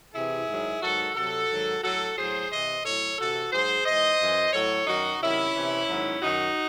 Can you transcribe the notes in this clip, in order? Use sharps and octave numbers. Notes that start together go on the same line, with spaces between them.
C3 E3 E4 G#4
G#2 D#3 F#3
G#2 D#3 F#3 F#4 A4
C3 F#3 F#4 A4
G#2 D#3 F#3
A2 F#3 F#4 A4
A2 F#3 G#4 C5
C3 E3 C5 D#5
A2 F#3 A4 C#5
C3 E3 F#4 A4
G#2 F#3 G#4 C5
G#2 E3 C5 D#5
F#2 E3
A2 F#3 A4 C#5
F#2 D#3 F#3 D#4 F#4
C3 D#3 F#3 C#4 E4
C3 E3
G#2 D#3 F#3
F#2 D#3 F#3 D#4 F#4